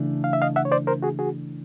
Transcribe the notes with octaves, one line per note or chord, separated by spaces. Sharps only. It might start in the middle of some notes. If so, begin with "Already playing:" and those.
Already playing: C#3 E3 A3 D4
F5
E5
D#5 F5
E5 F#5
C#5
C5 D5
A#4 C5
F#4 G#4
F#4 G#4